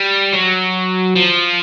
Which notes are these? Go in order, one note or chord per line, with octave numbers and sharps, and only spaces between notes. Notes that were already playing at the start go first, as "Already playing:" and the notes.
Already playing: G3
F#3
F3